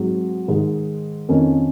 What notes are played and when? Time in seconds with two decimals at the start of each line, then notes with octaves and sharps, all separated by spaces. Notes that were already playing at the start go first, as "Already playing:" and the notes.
Already playing: G#2 F#3 C4 G#4
0.48 G#2 D#3 G#3
1.29 F2 D#3 A#3 C#4